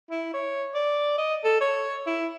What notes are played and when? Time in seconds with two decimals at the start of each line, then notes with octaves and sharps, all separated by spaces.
0.11 E4
0.34 C#5
0.74 D5
1.18 D#5
1.44 A4
1.61 C#5
2.07 E4